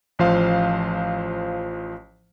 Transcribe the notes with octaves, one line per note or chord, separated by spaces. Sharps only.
A1 F3 C5 F5